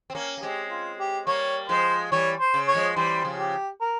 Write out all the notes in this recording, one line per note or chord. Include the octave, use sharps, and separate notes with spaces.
C4
A#3 C#4
A#3
G#3 C4 G4
F4
G4
G3 A#3 C#5
F3 G#3 C5
E3 G3 C#5
C5
C#3
C#5
F3 G#3
E3 G3 C5
C#3 F3
G4
A#4